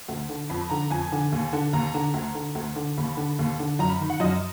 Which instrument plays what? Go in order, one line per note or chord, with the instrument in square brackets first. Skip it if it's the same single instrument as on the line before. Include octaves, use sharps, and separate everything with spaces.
[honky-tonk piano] D2
D3
F2 B5
D3 A#5
F2 G#5
D3
D#2
D3
D#2 A#5
D3
D2
D3
D2
D3
D#2 B5
D3
D#2
D3
F#2 A#5
B5
D#3
F#5
F#2 D#5